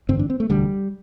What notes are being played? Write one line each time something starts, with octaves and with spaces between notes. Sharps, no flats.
A1 G2 D3 C4
D4
C4
A3
E1 D2 D3 G3